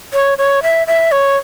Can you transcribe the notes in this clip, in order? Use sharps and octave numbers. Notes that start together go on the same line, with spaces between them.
C#5
C#5
E5
E5
C#5